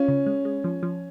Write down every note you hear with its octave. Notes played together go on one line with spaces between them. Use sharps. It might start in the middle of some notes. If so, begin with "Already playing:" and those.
Already playing: C#4 F4
C#3
G#3
G#3
F3
F3